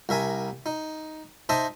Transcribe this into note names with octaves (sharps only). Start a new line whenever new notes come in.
C2 A#4 E5 G#5
D#4
D#4 C5 E5 A5 A#5 D#6